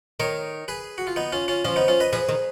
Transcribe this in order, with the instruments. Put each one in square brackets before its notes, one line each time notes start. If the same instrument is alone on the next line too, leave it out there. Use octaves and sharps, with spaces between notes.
[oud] D#3 [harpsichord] A#4 C#5
[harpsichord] G#4 B4
F#4
F4
B3 D#4
C#4 F4
C#4 F4
[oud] F3 [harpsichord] C#4 F4
[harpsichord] B3 D#4
C#4 F4
B4 D#5
[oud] F3 [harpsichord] G#4 B4
[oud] D#3